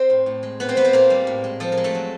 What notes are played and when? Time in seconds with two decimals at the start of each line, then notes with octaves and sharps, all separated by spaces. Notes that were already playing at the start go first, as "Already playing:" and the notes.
Already playing: C4 C5
0.10 A2
0.26 A2
0.43 G#3
0.60 A#2 B3 B4
0.69 C4 C5
0.76 G3 B3 B4
0.84 C4 C5
0.93 A#2 A#3 A#4
1.10 G3
1.27 A2
1.44 G#3
1.60 F3 A4
1.72 A#4
1.77 G#3
1.84 A3 A4
1.94 F#3